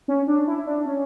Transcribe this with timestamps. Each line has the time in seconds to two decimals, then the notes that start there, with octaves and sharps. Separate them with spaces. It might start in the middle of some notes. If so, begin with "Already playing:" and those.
0.08 C#4
0.27 D4
0.47 E4
0.66 D4
0.85 C#4